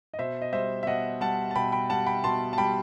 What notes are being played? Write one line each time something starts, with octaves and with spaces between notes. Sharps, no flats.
D#5
B2 C5 E5
D#5
G3 C5 E5
E5
B2 D#5 F#5
G3 F#5 A5
A5
B2 G5 B5
G5 B5
G3 F#5 A5
G5 B5
B2 A5 C6
A5
G3 G5 B5